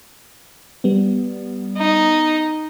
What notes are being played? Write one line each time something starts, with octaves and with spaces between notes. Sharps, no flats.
G3 B3
D#4